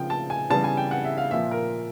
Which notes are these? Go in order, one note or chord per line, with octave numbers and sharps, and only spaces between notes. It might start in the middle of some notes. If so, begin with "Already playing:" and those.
Already playing: C#3 F3 A#3 G5
A5
G#5
C#3 E3 G3 B3 A5
G#5
G5
F#5
E5
F5
A#2 F3 A#3 E5
A#4